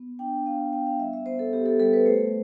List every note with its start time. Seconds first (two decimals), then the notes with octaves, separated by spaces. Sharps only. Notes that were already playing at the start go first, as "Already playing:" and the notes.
Already playing: B3
0.19 D4 G5
0.46 B3 F5
0.60 G5
0.73 B3 G5
0.86 F5
0.99 G3 E5
1.13 E5
1.26 B3 C5
1.39 A4
1.53 B3 G4
1.66 A4
1.80 G3 A4
1.93 B4
2.06 A3 C5